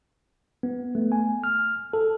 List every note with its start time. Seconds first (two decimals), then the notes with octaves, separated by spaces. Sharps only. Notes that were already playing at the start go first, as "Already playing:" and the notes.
0.63 B3
0.95 A3
1.12 G#5
1.44 F6
1.93 A4